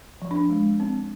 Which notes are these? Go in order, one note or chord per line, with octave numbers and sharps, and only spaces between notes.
F3
D4
G#3
C4